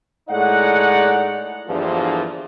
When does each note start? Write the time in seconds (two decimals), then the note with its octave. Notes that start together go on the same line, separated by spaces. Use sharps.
0.29 A2 G#3 D#4 D5 F#5
1.68 E2 G2 A#2 D3 E3 F3